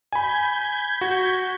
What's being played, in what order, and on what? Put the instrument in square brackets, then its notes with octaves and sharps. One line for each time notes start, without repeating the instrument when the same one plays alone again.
[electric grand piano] G#5 B5 [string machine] G6 G#6 B6
[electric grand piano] F#4